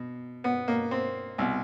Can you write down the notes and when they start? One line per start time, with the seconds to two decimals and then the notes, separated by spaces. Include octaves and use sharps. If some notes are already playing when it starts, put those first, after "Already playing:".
Already playing: B2
0.44 B3
0.68 A#3
0.91 C4
1.38 C2 B2